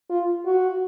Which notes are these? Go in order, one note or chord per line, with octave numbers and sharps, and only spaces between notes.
F4
F#4